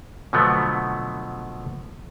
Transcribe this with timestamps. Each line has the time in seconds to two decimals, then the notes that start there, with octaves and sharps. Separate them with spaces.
0.33 B2 D3 F3 F#3 A3 B3